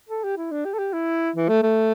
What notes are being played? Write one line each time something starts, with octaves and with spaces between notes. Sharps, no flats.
A4
G4
E4
D4
G4
A4
G4
E4
E3
A3
A3